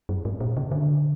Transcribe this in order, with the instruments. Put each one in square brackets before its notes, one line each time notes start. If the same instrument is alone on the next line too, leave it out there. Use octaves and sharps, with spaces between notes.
[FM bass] F#2
G#2
A#2
C#3
D3